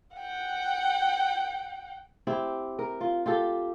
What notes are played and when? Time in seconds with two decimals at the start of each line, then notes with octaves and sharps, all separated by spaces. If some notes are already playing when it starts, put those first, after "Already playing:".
0.17 F#5 G5
2.27 C4 E4 G4
2.79 A#4
3.01 F4
3.26 F4 G4 A4